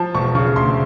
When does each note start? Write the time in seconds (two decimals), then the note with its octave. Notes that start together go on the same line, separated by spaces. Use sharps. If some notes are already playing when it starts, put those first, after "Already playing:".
Already playing: F3 A5
0.14 E1 C#6
0.35 C#3 C#6
0.56 D2 C6